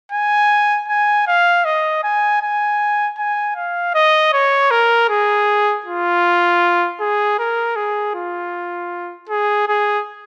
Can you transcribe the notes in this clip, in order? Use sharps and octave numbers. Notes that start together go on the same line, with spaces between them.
G#5
G#5
F5
D#5
G#5
G#5
G#5
F5
D#5
C#5
A#4
G#4
F4
G#4
A#4
G#4
F4
G#4
G#4